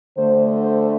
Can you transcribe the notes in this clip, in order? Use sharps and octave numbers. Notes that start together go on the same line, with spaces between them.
D2 D3 A3 C5
C5